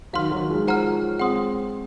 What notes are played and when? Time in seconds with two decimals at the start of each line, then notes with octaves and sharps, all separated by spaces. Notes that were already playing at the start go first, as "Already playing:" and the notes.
0.13 D#3 F#3 F5 C6 F6
0.31 D#3 F#3
0.50 F3 G#3
0.67 C5 F#5 A#5 F6
1.19 G#3 C4 F#5 C6 D#6